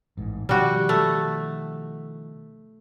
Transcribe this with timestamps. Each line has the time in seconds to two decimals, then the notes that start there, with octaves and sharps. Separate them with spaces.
0.17 A1 G#2
0.49 B2 D#3 F3 G3 F#4
0.89 A3